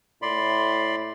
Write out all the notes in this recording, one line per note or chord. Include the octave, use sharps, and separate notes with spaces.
A2 D5 B5 C6